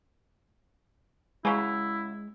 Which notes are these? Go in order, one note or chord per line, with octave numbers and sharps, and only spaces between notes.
C#3 F#3 G#3 E4